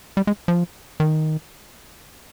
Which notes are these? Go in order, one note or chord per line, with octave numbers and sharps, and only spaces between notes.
G3
G#3
F3
D#3